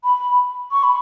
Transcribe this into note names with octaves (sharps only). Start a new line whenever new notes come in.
B5
C#6
B5